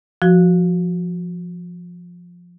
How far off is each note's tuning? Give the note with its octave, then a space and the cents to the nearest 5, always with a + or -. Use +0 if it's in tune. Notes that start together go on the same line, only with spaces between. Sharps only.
F3 +5 F#4 +0